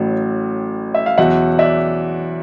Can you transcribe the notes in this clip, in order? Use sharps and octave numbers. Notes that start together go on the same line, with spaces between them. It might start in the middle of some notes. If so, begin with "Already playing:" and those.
Already playing: A1 A2 F#3
E5
F5
E2 B2 F#3 E5 F#5
D5 E5